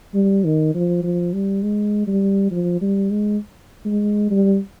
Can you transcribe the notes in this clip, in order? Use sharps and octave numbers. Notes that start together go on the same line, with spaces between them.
G3
D#3
F3
F3
G3
G#3
G3
F3
G3
G#3
G#3
G3